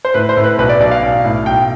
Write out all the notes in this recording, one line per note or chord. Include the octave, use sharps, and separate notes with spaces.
C5
A2 B4
C5
A2
B4
B1 B4
D5
B1 D5
F5
B1
A2
B1 G5